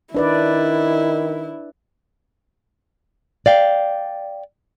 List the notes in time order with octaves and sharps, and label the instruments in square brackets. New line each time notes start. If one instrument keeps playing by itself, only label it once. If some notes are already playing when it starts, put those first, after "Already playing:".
[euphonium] D#3 [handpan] D4 B4 D5 [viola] E4
[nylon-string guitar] D5 F5 G5